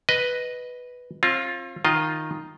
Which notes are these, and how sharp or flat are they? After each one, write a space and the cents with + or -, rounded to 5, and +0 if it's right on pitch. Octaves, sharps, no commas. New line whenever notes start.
B4 +0 D#5 +0
C4 +40 F4 +0
D#3 +0 F4 +0 D#5 +0